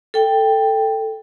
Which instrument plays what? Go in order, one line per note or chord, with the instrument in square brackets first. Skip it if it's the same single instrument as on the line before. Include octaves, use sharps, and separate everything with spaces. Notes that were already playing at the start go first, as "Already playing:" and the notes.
[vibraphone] A4 G5